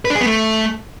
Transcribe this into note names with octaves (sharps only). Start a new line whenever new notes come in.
B4
D4
G#4
B3
A3